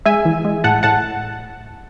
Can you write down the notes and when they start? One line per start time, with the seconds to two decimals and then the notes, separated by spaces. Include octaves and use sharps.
0.06 G#3 E5 G#5
0.25 E3
0.45 G#3
0.64 A2 F#5 A5
0.83 A2 F#5 A5